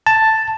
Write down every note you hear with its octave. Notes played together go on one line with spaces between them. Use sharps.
A5